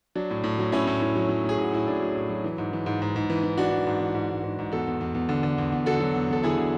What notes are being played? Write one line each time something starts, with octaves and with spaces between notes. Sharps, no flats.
F#3 D4
A2
A2
F#3
A2 C#4 E4
A2
A2
F#3
F#3
A2
G#4
A2 F#4
A2 E4
A2 D4
F#3
A2
F#3
E3
G#2
E3
G#2
G#2
G#2
E3
E3
E3 D4 F#4
E3
G#2
E3
G#2
G#2
G#2
G#2
E2 F#4 A4
E2
E2
E2
D3
D3
E2
E2
D3 F#4 A4
F#3
E2
E2 A4
D3 E4 G#4
D3